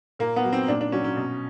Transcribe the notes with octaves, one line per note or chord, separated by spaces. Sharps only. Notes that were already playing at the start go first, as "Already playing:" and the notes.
A#2 A#3
B3
F#3
C4
A#2 D4
D4
F#3 C#4
C#4
B2